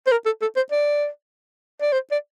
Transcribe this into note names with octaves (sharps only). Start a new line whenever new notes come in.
C5
A#4
A4
A4
C5
D5
D5
C5
D5